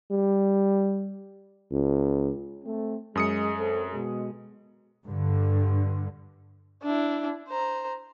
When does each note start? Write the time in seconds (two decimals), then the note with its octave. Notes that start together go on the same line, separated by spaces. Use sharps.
0.12 G3
1.72 C#2
2.65 A3 C4
3.15 F#2 G#3 D#6 C#7
3.58 C4 A4
3.92 B2 G#3
5.06 G2 D3
6.83 D4 E4
7.48 C5 A#5